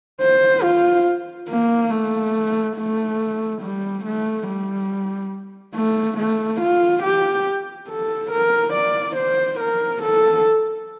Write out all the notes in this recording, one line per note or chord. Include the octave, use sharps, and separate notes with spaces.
C5
F4
A#3
A3
A3
G3
A3
G3
A3
A3
F4
G4
A4
A#4
D5
C5
A#4
A4